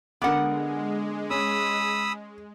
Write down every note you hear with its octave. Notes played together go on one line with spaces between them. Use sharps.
D3 G#3 B3 A#4 F#5 D6
C#4 B5 D#6 E6